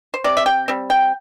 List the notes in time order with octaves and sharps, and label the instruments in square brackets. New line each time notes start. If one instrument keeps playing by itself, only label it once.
[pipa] C5
C3 D5
E5
G5
G3 C4
G5